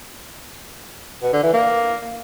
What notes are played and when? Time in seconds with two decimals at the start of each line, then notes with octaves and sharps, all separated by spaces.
1.23 B2
1.33 D3
1.43 E3
1.54 A#3